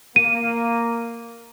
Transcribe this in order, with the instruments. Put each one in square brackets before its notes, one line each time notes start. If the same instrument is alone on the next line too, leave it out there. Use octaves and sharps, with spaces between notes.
[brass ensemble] A#3 [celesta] D#7